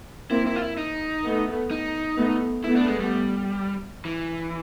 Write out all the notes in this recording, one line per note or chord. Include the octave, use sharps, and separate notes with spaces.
A#3 C4 E4
E4
F4
E4
D#4
A3 B3
D#4
A3 B3
A3 B3 E4
D4
G#3
G3
E3